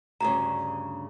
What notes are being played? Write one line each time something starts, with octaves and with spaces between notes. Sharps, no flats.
D2 G2 C#3 A#5